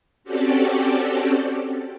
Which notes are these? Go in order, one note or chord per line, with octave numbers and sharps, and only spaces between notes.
C4 C#4 F#4 G4 A4 D5